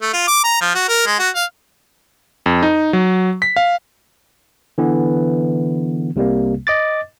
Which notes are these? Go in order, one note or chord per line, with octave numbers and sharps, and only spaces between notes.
A3
F4
D6
A#5
F3
F#4
A#4
G#3
F#4
F5
F2
D#4
F#3
B6
F5
D3 E3 B3
C2 C3 G3 A#3
D#5 D6 A6